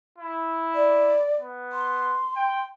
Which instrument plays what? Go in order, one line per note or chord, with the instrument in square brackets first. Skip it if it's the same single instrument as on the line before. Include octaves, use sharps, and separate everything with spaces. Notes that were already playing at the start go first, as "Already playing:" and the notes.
[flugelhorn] E4
[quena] D5
[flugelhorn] B3
[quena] C6
[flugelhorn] G5